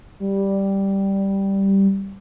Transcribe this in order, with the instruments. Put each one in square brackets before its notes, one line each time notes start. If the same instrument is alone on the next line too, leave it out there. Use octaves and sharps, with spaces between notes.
[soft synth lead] G3